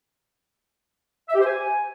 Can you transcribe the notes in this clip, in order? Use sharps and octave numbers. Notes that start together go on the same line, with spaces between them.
E5
G4
C5
G#5